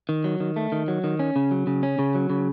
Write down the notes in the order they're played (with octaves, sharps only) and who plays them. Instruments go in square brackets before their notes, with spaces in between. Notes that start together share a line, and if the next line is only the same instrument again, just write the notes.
[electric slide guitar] D#3
F#3
D#3
A3
D#3
F#3
D#3
C#4
C#3
F#3
C#3
C#4
C#3
F#3
C#3